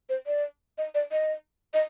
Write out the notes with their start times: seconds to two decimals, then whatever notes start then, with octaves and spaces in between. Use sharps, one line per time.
0.09 C5
0.27 D5
0.78 D#5
0.95 D5
1.12 D#5
1.74 D#5